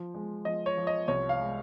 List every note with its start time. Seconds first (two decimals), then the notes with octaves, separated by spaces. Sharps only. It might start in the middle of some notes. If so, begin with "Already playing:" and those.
Already playing: F3
0.14 G#3
0.45 F3 D#5
0.66 C#5
0.77 F3
0.87 D#5
1.08 C2 C#5
1.29 F5
1.40 G#3